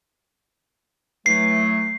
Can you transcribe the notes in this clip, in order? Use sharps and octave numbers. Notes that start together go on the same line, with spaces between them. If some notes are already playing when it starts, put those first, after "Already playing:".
E3 F#3 A3 C7